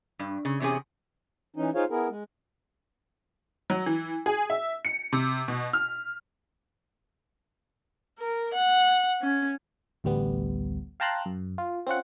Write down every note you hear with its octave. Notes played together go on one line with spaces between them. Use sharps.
G2
C#3
E2 C3 C#4 G#4
E3 C#4 D#4
D#4 F4 G#4 C5 C#5 F5
B3 E4 G#4 A#4
G#3
F#3
E3
G#4
E5
C#7
C3
B2
F6
A#4
F#5
C#4
A1 D2 G3 B3
F5 G5 A5 A#5 C6 F#6
F#2
F4
C4 C#4 F4 F#5